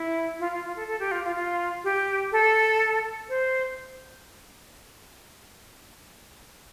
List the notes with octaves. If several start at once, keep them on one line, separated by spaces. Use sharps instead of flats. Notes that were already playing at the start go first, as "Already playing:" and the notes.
Already playing: E4
F4
F4
F4
A4
A4
G4
F4
F4
F4
G4
A4
C5